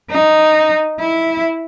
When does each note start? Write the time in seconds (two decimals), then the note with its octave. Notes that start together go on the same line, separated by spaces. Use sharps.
0.10 D#4
1.00 E4